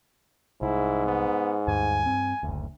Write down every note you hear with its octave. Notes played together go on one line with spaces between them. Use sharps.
C2 G#2 E4
B3
D2 G2 G#5
G2 C4
F#1 D2